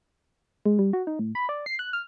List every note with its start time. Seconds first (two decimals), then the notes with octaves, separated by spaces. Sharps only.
0.66 G#3
0.79 G3
0.93 F#4
1.07 D#4
1.19 A2
1.35 B5
1.49 D5
1.66 C7
1.79 F#6
1.93 F6